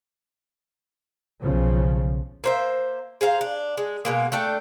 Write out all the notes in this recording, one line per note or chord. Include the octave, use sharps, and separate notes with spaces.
B1 C#3 F3
A#3 C5 E5
G#4 C5 F5 A#5
D4
G#3
B2 G#3 A#3
A3 D4 A4 G5